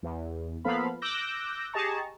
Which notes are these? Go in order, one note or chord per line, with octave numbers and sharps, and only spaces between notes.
E2
F3 A#3 B3 A4 F5 B5
D6 E6 F#6 G6 A#6
G4 G#4 D#5 A5 A#5 C#6